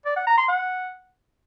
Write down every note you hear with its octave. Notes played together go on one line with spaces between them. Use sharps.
D5
F#5
A#5
C6
F#5